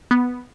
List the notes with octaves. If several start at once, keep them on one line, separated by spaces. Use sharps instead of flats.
B3